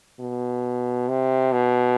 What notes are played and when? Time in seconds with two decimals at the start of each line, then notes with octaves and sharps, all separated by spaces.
0.20 B2
1.09 C3
1.52 B2